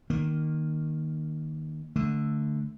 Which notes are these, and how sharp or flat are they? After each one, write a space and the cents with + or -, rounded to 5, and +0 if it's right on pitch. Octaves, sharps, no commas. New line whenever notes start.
D#3 -10 A#3 +0
D3 +0 A3 +0